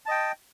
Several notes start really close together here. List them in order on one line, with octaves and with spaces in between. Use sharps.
A5 D#5 G5